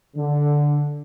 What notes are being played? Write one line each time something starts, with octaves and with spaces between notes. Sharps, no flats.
D3